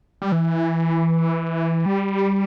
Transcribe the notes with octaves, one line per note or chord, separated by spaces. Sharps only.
G3
E3
G3